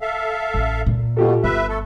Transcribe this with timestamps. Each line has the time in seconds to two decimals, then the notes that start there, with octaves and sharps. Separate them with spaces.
0.01 A4 E5 F5
0.54 A1
0.86 A#2
1.17 B2 F4 G4 A4
1.44 G1 B4 E5
1.69 A3 A4